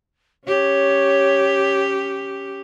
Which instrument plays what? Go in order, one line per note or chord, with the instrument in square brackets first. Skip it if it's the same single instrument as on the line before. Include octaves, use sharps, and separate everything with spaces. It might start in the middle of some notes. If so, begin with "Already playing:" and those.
[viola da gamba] C#4 G4 [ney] C#5